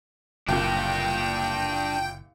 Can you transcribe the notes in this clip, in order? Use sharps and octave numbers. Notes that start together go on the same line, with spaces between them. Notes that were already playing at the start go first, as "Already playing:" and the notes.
F#1 C2 A#2 D4 G4 G5